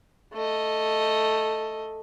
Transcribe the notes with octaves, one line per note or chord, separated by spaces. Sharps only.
A3 D#5